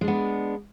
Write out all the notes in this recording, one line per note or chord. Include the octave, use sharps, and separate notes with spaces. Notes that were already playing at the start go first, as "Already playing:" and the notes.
G#3 B3 D4